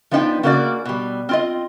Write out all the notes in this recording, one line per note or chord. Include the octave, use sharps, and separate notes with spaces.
F3 B3 D4 D#4 C5 G5
C#3 A#3 F#4 D5
B2 G3
C4 F4 D#5